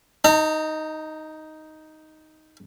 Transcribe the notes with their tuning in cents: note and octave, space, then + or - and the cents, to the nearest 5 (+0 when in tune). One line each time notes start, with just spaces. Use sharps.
D#4 +5 A#5 -35